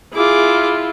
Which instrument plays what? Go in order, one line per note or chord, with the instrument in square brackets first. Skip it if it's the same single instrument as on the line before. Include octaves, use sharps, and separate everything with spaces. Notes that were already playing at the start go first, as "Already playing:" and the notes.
[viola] E4 F4 [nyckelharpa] G#4 D6